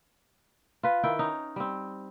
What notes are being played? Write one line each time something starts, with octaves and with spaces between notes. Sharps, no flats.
F4 B4
D#3 E4 G5
C#4 D#4
G3 C4